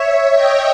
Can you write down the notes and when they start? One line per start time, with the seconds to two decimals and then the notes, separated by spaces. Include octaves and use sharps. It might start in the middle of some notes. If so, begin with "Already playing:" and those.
Already playing: C#5 E5
0.35 D#5 G5